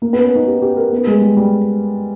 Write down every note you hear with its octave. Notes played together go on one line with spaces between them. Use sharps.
A#3
B3
C#4
D#4
G4
G4
A#4
B3
G#3
G3
G3